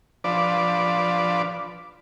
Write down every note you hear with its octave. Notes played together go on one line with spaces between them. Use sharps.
F3 D4 B4 D5